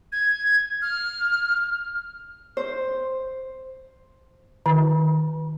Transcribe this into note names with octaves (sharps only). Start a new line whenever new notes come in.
G#6
F6
C5
D#3